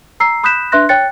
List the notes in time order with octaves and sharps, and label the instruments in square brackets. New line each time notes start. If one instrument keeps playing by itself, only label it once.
[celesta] A#5 E6 C7
B5 D#6 F#6 G6 B6 E7
D4 B4 E5 C6 F#6 A#6
C#5 G5 F#6 A6 C#7